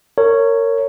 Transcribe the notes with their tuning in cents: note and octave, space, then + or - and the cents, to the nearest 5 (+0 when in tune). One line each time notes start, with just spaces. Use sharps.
A#4 -25 C#5 +0